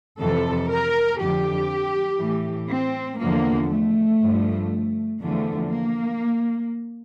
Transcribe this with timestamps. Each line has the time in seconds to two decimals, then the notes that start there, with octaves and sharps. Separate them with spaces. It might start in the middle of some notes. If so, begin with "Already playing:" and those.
0.19 F2 C3 E3 A4
0.69 A#4
1.19 F2 D3 F3 G4
2.19 A2 E3
2.69 C4
3.20 E2 D3 F3 A#3
3.70 A3
4.20 G2 D3 F3
5.21 E2 D3 F3 A3
5.71 A#3